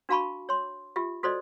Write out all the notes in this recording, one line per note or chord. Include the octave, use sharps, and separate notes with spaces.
D4 F#4 F5 A5 B5 C#6
C#5 C6
F4 G4 E5
F#4 A4 C5 D5 D#5